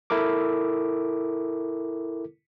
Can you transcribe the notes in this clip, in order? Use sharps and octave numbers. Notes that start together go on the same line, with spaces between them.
E4 A4 A#4 D6